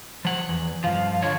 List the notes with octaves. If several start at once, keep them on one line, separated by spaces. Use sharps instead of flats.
F3 F#5
E2
G2 F3 F5
D3 C#5 F5